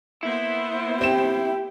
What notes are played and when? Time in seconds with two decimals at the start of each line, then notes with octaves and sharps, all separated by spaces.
0.23 A#3 B3 E4 C5
1.01 C4 G4 E7